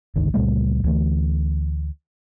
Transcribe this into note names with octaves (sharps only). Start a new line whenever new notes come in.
G1 C#2 D#3
C#2 A#2 G3 A3
D2 E3 A3